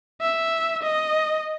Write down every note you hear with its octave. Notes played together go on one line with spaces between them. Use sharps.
E5
D#5